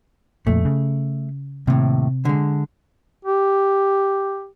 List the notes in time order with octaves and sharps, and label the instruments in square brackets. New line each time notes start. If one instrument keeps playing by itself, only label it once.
[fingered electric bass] F2 A#2 [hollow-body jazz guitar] A3
[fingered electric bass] C#3
[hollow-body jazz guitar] D#2 A2 [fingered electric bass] C3 C4
[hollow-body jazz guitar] D3 G#3
[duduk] G4